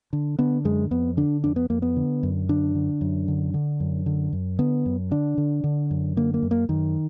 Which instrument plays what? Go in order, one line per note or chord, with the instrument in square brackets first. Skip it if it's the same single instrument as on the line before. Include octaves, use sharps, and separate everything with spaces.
[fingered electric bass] D3
D3 B3
F#2 G#3
F2 B3
D3 D4
F2 D4
B3
F2 A#3
B3
D3
F#2
D3 D4
D3
F#2
D3
D3
F#2
D3
F#2
D3 B3
F#2
D3 D4
D3
D3
F#2
D3 A#3
A#3
F#2
A#3
F#2 D#3